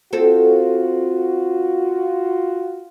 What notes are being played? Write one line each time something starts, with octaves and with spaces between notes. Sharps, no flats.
C4 F4 F#4 A4